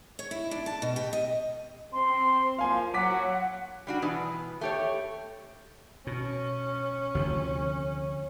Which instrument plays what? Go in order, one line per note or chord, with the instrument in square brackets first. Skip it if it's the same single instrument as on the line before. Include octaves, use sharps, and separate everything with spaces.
[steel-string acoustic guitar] C#5
E4
D4
A5
B2
G4
D#5
[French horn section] C4 [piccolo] C6
[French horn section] F3 A#3 [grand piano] F5 G#5
[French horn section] F#3 [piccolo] F#5 [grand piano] D6 B6
[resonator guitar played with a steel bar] G3 D4 F#4
B2 E3 B3
A3 G4 C#5
[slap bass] B2 [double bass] C#4
[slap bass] D2 C3 F3